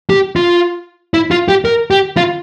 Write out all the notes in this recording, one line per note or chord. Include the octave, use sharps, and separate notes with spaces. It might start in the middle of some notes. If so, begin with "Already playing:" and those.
G4
F4
E4
F4
G4
A#4
G4
F4